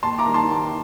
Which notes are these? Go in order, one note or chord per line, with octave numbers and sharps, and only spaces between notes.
D#2 A5 C6
A#5 D6
D#3 G3
A5 C6
D#2